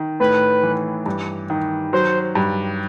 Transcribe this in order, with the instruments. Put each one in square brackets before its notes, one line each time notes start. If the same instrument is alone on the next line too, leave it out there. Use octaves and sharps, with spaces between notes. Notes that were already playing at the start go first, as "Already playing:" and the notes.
Already playing: [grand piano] D#3
[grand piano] A2 [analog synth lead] B4
[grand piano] E3
G2
D#3
[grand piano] F#3 [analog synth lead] C5
[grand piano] G2